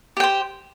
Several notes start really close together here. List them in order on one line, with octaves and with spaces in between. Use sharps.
G4 G5 C5